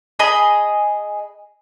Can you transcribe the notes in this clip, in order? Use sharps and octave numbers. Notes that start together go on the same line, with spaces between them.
G#4 D#5 B5